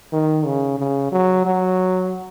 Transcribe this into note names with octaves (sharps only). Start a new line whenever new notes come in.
D#3
C#3
C#3
F#3
F#3